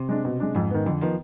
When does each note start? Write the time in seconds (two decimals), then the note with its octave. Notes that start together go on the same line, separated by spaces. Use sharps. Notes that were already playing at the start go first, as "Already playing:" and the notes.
Already playing: C3
0.09 G#3 D4
0.25 B2
0.40 G#3 D4
0.55 F2 G#2
0.71 D#3 B3
0.86 F2 D3
1.01 D#3 F3 B3